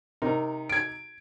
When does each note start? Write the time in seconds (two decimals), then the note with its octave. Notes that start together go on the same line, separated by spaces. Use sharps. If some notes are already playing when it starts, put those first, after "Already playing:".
0.22 C3 D#4 A#4
0.69 G#6 D7